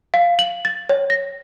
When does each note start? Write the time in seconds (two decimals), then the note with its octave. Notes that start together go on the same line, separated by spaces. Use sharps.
0.14 F5
0.39 F#7
0.65 A6
0.89 C#5
1.10 A#6